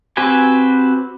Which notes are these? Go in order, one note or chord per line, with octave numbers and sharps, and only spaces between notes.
C4 F#4 G4 B4 G#5